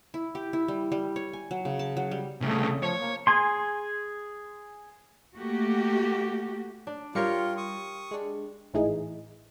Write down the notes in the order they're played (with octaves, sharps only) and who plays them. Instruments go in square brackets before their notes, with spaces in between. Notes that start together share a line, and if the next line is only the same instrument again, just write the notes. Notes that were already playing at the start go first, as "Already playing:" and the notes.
[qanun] E4
G4
E4
G3
G3
C#5
G#5
F#3
C#3
A5
F#3
G3
[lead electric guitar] C2 C#3 [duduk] A3
[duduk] F3 [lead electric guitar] C#5
[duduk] A#3
[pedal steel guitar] G#4 G#5 C6
[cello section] A3 A#3 F#4 G4
[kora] D4
[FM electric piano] G3 F5 C#7 [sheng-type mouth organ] F4 [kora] G4 A#4 C#5
[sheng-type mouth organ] C#6 D#6
[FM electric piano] G#3 D4
[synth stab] G#1 A2 E3 D#4 G#4